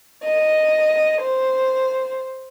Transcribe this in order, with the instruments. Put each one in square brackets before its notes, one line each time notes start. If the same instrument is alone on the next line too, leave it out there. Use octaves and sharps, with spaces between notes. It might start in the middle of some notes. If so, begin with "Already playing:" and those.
[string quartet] D#5
C5